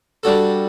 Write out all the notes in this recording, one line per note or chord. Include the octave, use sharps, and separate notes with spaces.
G3 D4 F#4 A4